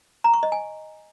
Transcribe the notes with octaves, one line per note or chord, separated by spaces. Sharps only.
A#5
C#6
D#5
G#5